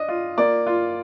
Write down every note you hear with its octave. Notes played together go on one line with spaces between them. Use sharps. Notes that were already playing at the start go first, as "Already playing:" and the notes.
Already playing: D4 D#5
F4
A#3 D5
F4